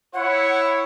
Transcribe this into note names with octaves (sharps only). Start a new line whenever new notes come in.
E4 C#5 F#5